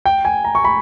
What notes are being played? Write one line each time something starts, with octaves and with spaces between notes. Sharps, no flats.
G5
G#5
A#5
C#6
B5